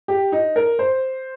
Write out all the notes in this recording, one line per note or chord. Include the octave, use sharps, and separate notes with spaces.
G4
D#4
A#4
C5